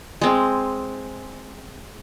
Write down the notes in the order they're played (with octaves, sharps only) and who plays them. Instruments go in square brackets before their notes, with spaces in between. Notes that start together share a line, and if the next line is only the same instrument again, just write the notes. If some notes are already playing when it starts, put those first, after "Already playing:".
[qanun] G#3 C4